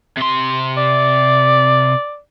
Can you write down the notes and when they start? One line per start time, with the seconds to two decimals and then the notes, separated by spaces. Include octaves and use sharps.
0.17 C3 C6
0.78 D5